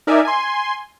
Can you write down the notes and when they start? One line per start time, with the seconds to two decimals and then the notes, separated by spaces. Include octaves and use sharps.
0.07 D#4 A#4 D5 E5 G#5
0.25 G#5 C6